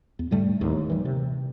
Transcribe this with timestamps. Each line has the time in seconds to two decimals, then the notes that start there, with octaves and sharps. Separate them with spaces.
0.19 E2
0.31 G#2 D3 G3 A3
0.61 D1 D#2 A2
0.90 E3 G3
1.05 C3